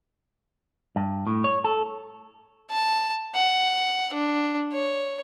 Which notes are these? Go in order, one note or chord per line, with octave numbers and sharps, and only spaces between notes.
G2
A2
C#5
A4
A5
F#5
D4
C#5